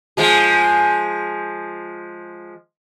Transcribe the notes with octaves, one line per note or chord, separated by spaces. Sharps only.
F3 G#3 G#4